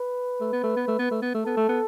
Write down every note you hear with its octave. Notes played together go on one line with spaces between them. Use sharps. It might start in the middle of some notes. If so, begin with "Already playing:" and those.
Already playing: B4
A3
B3
A3
B3
A3
B3
A3
B3
A3
B3 A4
A3
B3